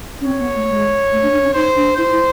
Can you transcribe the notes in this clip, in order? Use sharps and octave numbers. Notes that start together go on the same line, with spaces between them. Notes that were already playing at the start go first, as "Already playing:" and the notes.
C#4
C4 C#5
B3
A3
G#3
A3
D4
D4
C#4
D#4 C5
D4
E4 C5
E4